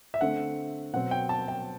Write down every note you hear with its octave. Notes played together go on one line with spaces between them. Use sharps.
E5
D3 A3 C4 F#5
B2 F#3 C4 F#5
G5
A5
G5